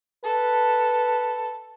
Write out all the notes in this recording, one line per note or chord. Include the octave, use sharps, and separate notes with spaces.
A4 B4